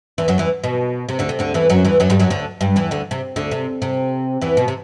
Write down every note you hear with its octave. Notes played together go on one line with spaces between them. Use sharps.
E2 E3
F#2 F#3
E2 E3
B2
C3
D2 D3
C3
D2 D3
E2 E3
F#2 F#3
E2 E3
F#2 F#3
G2 G3
F#2 F#3
D2 D3
G2 G3
E2 E3
D2 D3
C3
D2 D3
C3
C3
E2 E3
B2
C3